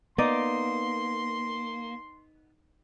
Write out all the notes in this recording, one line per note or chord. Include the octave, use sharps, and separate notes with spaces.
A#3 B3 D#4 D5 D#5 C6